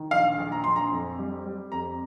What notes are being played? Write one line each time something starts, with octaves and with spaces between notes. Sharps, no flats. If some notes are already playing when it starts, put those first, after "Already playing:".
Already playing: D#3
A#1 F5
A#1
A#5
A#1 C6
A#5
F2
G3
G3
F2 A#5